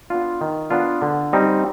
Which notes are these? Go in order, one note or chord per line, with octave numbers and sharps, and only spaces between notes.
B3 D4 F4
D#3
B3 D4 F4
D3
G3 C4 D#4